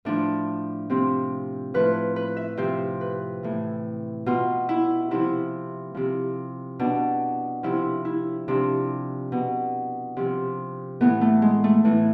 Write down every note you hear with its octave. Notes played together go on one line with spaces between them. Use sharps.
A2 F3 D4
C3 F3 C4
A2 F3 B4
B4
E5
C3 F3 C5
B4
A2 E3
B2 F4
E4
C3 F3 E4
C3 F3
B2 D4
C3 F3 E4
E4
C3 F3 D4
B2
C3 F3
A2 E3 B3
A3
G#3
A3
A2 E3